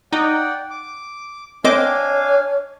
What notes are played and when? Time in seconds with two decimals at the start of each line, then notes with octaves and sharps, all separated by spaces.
0.13 D#4 D5 F#5 G5
0.70 D6
1.64 C4 D4 C#5 D#5 F5 G#5 D6